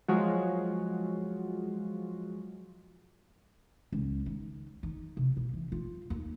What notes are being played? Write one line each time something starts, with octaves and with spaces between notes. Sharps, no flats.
F3 F#3 G#3 F4 F#4
C#2
D#3
D#3
C3
B2
E3
F4
D#2